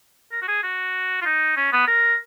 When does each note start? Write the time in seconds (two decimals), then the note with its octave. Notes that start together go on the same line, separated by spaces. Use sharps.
0.32 A#4
0.42 F#4
0.48 G#4
0.63 F#4
1.22 F4
1.26 D#4
1.57 C#4
1.73 B3
1.88 A#4